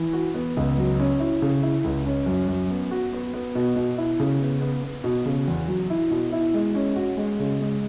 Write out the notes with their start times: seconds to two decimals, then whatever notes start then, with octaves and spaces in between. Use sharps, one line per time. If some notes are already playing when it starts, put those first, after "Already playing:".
Already playing: E3
0.13 F#4
0.34 B3
0.57 C#2
0.78 F#3
0.99 C#4
1.20 E4
1.42 C#3
1.63 E4
1.84 C#2
2.06 C#4
2.26 F#2
2.48 F#2
2.70 B3
2.91 F#4
3.13 B3
3.34 B3
3.55 B2
3.76 B2
3.98 E4
4.20 C#3
4.41 B3
4.62 B3
4.83 B3
5.04 B2
5.26 C#3
5.48 E2
5.68 F#3
5.90 E4
6.11 B2
6.33 E4
6.54 G#3
6.75 C#4
6.96 F#4
7.17 G#3
7.40 C#3
7.61 G#3